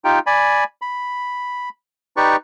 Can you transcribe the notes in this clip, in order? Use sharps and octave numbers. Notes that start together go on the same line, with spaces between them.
D#4 F4 G4 G5
D5 G#5 B5
B5
D#4 G4 B4 D5 C#6